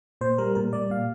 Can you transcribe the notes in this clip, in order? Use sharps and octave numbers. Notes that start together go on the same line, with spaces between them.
A#2 C5
G3 A#4
A#2 A#4
G3 D5
A#2 F5